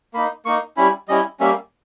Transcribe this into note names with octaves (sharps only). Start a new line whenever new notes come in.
A#3 D#4 B5
A#3 D#4 C#6
G3 C#4 E4 B5
G3 C#4 E4 D#5
G3 A#3 C#4 E5